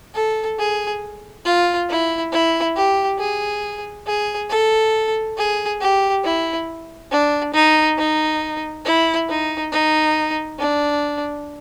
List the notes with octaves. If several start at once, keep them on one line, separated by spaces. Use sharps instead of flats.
A4
G#4
F4
E4
E4
G4
G#4
G#4
A4
G#4
G4
E4
D4
D#4
D#4
E4
D#4
D#4
D4